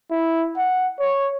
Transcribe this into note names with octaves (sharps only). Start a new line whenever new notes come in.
E4
F#5
C#5